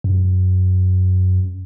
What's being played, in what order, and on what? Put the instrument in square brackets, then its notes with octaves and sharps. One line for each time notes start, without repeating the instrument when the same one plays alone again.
[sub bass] F#2